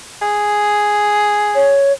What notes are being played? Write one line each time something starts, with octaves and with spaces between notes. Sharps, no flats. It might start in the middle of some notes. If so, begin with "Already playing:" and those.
G#4
C#5